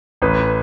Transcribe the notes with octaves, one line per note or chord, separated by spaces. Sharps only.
A1 B4